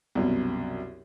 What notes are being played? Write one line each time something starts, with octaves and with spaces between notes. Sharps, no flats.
C2 F#2 B2